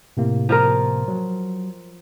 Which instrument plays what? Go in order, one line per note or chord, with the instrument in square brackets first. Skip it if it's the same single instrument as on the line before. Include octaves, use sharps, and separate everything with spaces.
[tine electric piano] A2 C3 A#3
[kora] F3 F4 A#4
[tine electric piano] F#3